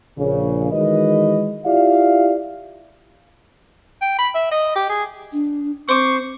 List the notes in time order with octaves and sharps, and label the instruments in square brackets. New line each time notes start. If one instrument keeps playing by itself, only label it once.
[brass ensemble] A#1 C#3
D#3 E3 G#3 F#4 B4 D#5
E4 F4 G4 D5 E5 F5
[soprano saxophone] G5
B5
E5
D#5
G4
G#4
[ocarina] D4
[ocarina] C4 [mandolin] C5 D6 [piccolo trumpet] C#6